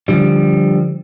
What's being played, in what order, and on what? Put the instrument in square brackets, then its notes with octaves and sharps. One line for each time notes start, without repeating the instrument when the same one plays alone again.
[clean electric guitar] D3 F3 G3